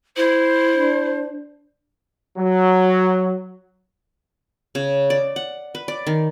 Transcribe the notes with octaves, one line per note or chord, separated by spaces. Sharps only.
E4 C5
D4
F#3
C#3
D5
F#5
B4
D5
D#3